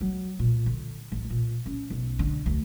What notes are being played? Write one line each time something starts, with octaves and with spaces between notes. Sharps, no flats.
F#3
A#2
D3
A1
A#2
C#4
B1
D3
D2